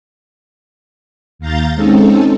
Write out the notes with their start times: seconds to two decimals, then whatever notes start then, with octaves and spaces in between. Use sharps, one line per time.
1.39 D#2 F5 A#5 G6 A6
1.75 G#3 C4 C#4 D#4 A4